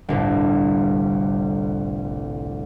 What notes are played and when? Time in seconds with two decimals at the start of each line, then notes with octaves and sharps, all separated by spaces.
0.09 G1 C2 A2